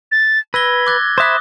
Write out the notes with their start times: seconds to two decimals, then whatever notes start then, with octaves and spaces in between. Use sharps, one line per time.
0.12 A6
0.54 B4 E6 G#6 A#6 G7
0.87 D6 F#6 A6
1.18 C5 E5 B5 D6 D#6 F#6